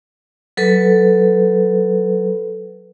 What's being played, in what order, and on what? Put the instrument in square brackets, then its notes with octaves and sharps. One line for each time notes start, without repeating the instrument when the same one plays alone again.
[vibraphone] F#3 A4 B4